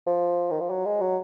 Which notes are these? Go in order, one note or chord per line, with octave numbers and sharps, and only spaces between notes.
F3
D#3
F3
F#3
G#3
F#3